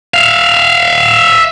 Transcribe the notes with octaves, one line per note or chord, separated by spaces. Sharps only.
E5 F5